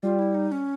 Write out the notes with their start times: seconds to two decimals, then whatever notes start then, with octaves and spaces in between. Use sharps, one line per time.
0.03 G3 F4
0.19 E4
0.34 D#4
0.52 C#4